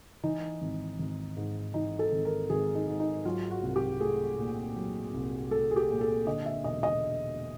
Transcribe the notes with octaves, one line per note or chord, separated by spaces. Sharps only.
E3 D#4
G#1
G#1
G#2
E3 D#4
A4
G#1
A#4
G#1 G#4
D#4
G#2
D#4
F#3 F4
F#4
C2
G4
A3 G#4
A#2
F#3
C2
A3 A4
G#4
G4
A#2
A4
D3 D#5
E5
E1 D#5
D#5